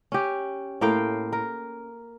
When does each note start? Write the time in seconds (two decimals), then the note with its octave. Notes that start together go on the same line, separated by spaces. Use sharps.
0.12 C#4 G4
0.81 A2 A#3 F5 G5
1.33 A#4